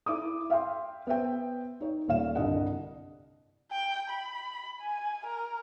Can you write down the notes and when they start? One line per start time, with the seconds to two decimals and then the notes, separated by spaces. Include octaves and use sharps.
0.06 E4 D6 D#6
0.50 E5 F5 G5 C6
1.07 B3 C5 E5 G5
1.80 D#4 C#5
2.08 D#1 A#2 C#5 F5 E7
2.35 G1 C2 D3 D#5 F#5
3.72 G5
4.10 B5
4.81 G#5
5.26 A#4